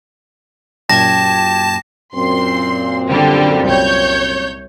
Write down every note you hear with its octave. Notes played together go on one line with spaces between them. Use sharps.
F#2 A#2 G4 A5 G#6 A#6
F#2 A#2 C4 C6
D3 G3
C2 C#5 G6